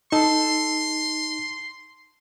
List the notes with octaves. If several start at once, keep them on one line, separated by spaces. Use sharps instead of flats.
D#4 A4 C6